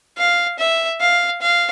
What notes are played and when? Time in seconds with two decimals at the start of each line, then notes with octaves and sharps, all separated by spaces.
0.18 F5
0.59 E5
1.00 F5
1.41 F5